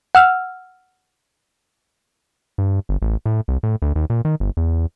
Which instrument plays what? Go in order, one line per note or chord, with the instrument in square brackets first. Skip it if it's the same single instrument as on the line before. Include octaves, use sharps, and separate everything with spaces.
[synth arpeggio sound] F#5 E6 F6
[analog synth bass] G2
G1
A1
A2
C2
A2
D2
D#2
A#2
D#3
G1
E2